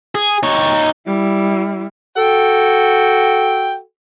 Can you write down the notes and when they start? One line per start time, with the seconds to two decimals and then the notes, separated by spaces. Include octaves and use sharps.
0.15 G#4
0.43 D#4 C#5
1.07 G3 E4
2.17 F#4 A4 G5